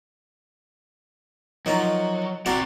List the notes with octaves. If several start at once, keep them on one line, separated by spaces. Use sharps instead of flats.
D#3 F3 F#3 D#4
C4 F#4 C5 D5 F#5 A#5